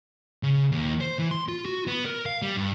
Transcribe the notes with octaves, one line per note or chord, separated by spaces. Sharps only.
C#3
D#2
C5
E3
C6
F4
F#4
B3
A#4
F5
G3
G2